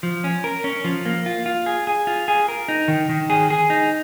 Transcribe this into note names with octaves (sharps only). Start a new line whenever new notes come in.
F3
C#4
A#4
C#4
F3
A#3
F4
F4
G#4
G#4
F4
G#4
A#4
D#4
D#3
D#3
G#4
G#4
D#4